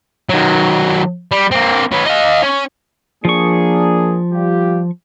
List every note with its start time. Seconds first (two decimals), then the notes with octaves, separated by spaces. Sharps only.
0.29 D#3 F#3
1.32 G3
1.51 A#3 C4
1.92 C#4 B4
2.06 D#5 F5
2.43 C#4
3.25 F3 A#3 D4 G#4 C#6
4.32 G3 F4 G4